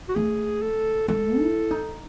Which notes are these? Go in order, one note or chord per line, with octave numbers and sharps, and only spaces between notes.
F#4
A3 G#4
A4
G#3 A4
E4
D#4